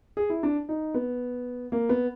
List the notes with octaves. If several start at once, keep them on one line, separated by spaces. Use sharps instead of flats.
G#4
E4
D4
D#4
B3
A#3
B3